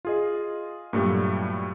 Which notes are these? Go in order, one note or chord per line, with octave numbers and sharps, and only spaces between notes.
F4 G#4 D#5
G2 A#2 F#3 G3 A3